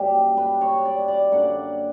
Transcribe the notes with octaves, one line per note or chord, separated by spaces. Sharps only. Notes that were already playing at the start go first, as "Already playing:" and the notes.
Already playing: F#2 C#3 G3 A#3 G4
B4
C#5
D5
D5
F#2 D3 A#3 F#5